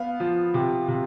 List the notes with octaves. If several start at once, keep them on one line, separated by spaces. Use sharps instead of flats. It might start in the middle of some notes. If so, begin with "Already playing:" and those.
Already playing: B3 F5
F3
C3
C3